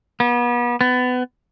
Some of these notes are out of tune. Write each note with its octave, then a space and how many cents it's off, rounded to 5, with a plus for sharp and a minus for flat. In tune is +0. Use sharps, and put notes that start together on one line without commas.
B3 -35
B3 +25